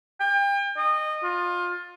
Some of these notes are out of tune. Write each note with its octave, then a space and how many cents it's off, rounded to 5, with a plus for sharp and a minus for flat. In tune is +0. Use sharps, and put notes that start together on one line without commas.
G5 +35
D#5 -20
F4 +20